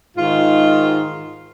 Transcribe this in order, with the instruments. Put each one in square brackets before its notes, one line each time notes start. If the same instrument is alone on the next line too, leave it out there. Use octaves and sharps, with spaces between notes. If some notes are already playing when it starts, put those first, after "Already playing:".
[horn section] G#2 D#3 F4